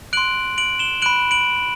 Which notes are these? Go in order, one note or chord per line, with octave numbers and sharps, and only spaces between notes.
C6 F#6 D7 F#7
D7 F#7
E7 G7
B5 F#6 D7 F#7
D7 F#7